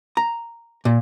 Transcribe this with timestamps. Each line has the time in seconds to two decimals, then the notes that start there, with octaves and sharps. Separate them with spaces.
0.17 A#5
0.85 A#2